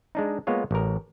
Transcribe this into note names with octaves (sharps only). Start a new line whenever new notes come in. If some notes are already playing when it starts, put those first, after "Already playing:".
G#3 D4 D#4
G#3 A#3 B3 F4 C#5
A1 A#4